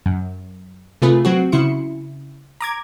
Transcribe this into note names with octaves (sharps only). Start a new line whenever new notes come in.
F#2
C3 A3 F4 G#4 B4
F#3 C4 F#4
C#3 E4 C6 C#7
A#5 D6 G#6